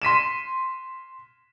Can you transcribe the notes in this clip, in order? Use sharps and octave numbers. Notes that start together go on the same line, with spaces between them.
C6 B6 D#7 E7